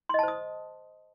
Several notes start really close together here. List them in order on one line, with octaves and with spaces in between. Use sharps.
C6 D#5 A5 C5 D#6